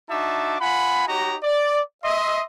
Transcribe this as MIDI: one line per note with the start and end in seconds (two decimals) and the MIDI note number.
0.10 0.57 62
0.10 0.57 63
0.10 0.57 66
0.10 0.57 76
0.10 0.57 81
0.10 0.57 86
0.61 1.06 65
0.61 1.06 78
0.61 1.06 80
0.61 1.06 83
1.08 1.37 63
1.08 1.37 66
1.08 1.37 67
1.08 1.37 73
1.08 1.37 75
1.08 1.37 82
1.43 1.81 74
2.04 2.44 75
2.04 2.44 76
2.04 2.44 84